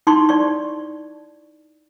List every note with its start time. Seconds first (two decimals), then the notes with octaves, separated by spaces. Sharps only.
0.07 D#4 E4 A5 C6 C#6
0.29 D5 C#6